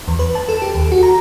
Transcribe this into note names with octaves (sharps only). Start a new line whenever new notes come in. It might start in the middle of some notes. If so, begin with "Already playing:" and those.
E2
B4
A5
A4
G4
D#2
F#4
A#5